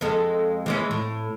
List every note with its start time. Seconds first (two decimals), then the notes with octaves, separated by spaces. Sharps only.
0.01 F2 G#3 A4
0.66 E3 G#3 C#4
0.91 A2